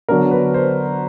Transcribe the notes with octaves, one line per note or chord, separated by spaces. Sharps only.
D3 F#3 B3 D4 A#4
B4
C5